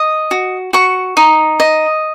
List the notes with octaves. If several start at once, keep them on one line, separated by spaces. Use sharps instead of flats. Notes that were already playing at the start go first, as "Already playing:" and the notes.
Already playing: D#5
F#4
F#4 C#6
D#4
D#5